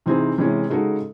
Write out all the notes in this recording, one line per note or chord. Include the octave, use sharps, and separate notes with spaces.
C3 E3 C4 D#4 G#4
C3 E3 G#3 C#4
C#3 G#3 D#4 F#4 A4